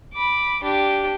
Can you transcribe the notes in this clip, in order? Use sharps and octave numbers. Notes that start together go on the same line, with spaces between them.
B5 D6
D4 G4